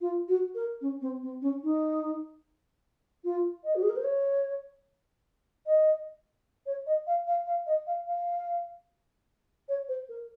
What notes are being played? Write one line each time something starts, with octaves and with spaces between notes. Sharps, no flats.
F4
F#4
A#4
C#4
C4
C4
C#4
D#4
F4
D#5
F#4
G#4
A#4
C5
C#5
D#5
C#5
D#5
F5
F5
F5
D#5
F5
F5
C#5
C5
A#4